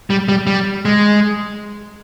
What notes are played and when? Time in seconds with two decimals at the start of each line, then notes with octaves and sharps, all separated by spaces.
0.10 G3
0.28 G3
0.47 G3
0.85 G#3